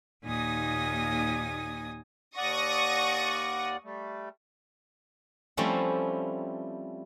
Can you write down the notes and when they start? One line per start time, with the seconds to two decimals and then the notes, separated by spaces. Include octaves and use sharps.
0.25 D#2 A#2 D#4 G#5 D#6 A#6
2.37 D#2 D5 F#5 C#6 D#6 A#6
3.84 G3 A3
5.57 F3 G3 A3 C4 C#4 E4